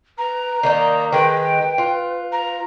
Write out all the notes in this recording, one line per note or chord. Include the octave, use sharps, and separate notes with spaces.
B4 A#5
D#3 A#3 D#4 D5
D#3 G#3 B4 G5
F4
A#5